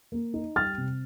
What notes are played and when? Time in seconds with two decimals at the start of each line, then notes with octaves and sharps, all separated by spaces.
0.12 A#3
0.34 D#4
0.56 G3 F6 A6
0.78 C3